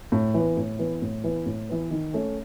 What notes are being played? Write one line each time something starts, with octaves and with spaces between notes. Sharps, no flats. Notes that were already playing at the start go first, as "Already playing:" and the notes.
A2
E3 B3
A2
E3 B3
A2
E3 B3
A2
E3 B3
D#3
A3 C#4